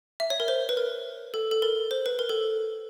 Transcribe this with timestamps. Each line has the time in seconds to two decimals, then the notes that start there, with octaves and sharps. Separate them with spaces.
0.20 E5
0.30 C#5
0.40 A#4
0.48 C5
0.69 B4
0.77 A#4
1.34 A4
1.51 A4
1.62 A#4
1.91 C5
2.06 B4
2.19 A#4
2.29 A4